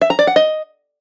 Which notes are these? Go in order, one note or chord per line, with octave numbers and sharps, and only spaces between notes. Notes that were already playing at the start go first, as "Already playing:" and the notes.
E5
A#5
D5
F#5
D#5